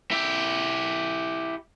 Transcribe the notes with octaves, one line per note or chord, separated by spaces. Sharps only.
E4 G4